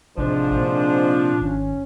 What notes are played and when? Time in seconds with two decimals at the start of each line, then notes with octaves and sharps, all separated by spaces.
0.18 A1 G#2 C3 F3 D4 C5
0.56 A#2
1.41 G#1 C#4